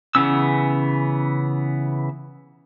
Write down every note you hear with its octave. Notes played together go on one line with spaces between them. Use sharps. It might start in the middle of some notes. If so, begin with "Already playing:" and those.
C#3 E3 B3 C#4 E6